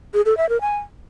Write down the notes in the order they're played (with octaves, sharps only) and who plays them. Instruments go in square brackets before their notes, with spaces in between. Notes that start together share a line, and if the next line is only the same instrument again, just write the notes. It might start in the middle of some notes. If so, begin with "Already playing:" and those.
[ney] G#4
A4
E5
A#4
G#5